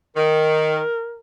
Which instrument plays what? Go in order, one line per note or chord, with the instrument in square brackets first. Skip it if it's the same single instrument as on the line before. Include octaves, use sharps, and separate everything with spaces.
[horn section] D#3 [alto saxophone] A#4